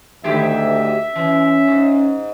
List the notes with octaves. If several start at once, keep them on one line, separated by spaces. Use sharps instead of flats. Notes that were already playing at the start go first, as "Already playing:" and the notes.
D2 G#2 D#3 G4 E5
E3 C#4
G#2